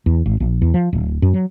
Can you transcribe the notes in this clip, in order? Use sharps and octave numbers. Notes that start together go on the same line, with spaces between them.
E2
G#1
A#1
E2
F3
D1
F#2
F#3